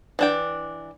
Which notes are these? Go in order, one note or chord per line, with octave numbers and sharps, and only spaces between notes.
E3 D4 G5